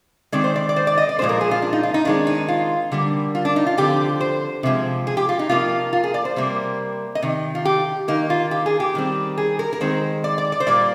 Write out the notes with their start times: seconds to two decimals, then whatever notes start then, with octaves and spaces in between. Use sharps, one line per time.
0.32 D#3 G#3 C4 D5
0.44 C5
0.56 D5
0.69 D5
0.76 C5
0.87 D5
0.98 D#5
1.09 D5
1.19 A#2 F3 G#3 C4 C5
1.29 A#4
1.41 G#4
1.51 F4
1.62 D4
1.73 D#4
1.83 F4
1.94 D#4
2.05 D#3 G#3 C4 D4
2.27 D#4
2.48 F4
2.92 D3 G3 A#3
3.35 F4
3.45 D4
3.56 D#4
3.66 F4
3.78 D3 F3 C4 G4
4.21 C5
4.63 C3 F3 G#3
5.07 G#4
5.17 G4
5.29 F4
5.39 D#4
5.49 C3 F3 A#3 F4
5.93 F4
6.04 G#4
6.14 D5
6.25 C5
6.36 C3 G3 A#3
7.15 D#5
7.22 C3 D#3
7.55 F4
7.65 G4
8.08 D#3 A#3 D#4
8.30 F4
8.51 G4
8.66 G#4
8.80 G4
8.95 D#3 G3 C4
9.38 G#4
9.59 A#4
9.73 A#4
9.81 D#3 G#3 C4 C5
10.24 D5
10.38 D5
10.52 D5
10.60 C5
10.67 A#2 G3 A#3 D5